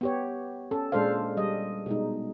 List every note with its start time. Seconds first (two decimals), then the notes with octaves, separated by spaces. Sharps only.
0.01 B3 G4 C#5
0.71 C#4 A4
0.92 A#2 G#3 D4 A4 C5 F5
1.37 G3 D#5
1.86 B2 G#3 D#4